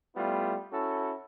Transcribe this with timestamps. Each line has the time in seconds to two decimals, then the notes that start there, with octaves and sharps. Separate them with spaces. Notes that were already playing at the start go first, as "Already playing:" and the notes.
0.15 G3 A3 B3 E4 F4
0.71 C#4 E4 F#4 A4